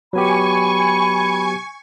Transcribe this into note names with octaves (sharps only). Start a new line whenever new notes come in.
F#3 B3 G4 G#5 B5 C#6